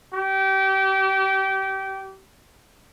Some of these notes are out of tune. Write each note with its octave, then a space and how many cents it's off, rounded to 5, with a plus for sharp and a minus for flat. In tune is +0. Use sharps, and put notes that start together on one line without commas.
G4 -25